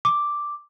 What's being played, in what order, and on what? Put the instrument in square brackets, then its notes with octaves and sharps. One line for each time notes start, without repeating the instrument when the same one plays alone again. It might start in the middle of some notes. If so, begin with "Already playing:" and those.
[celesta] D6